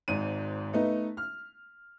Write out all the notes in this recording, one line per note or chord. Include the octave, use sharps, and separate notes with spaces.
G#1 G#2 D#7
A3 B3 D#4
F6